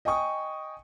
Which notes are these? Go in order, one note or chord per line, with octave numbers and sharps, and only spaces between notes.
D#5 G5 G#5 C#6 D#6